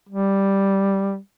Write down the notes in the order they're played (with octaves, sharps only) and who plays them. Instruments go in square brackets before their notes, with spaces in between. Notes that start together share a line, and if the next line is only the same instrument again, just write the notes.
[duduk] G3